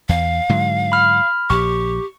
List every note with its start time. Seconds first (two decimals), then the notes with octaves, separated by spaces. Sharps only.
0.09 E2 F5
0.49 G#2 D3 F#3
0.92 B5 F6
1.50 A#1 G4 C#6